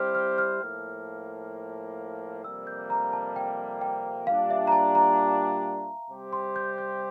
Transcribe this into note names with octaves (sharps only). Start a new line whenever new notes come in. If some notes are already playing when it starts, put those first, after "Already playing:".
Already playing: G3 C4 E4 G4 C5 F6
F6
F6
A2 F3 A#3
F2 C3 G3 A#3 E6
G6
A#5
A5
G5
G5
A#2 G3 D4 G4 F5
E5
A#5
A5
A#5
C3 G3 C4 G4 C5
C6
G6
G6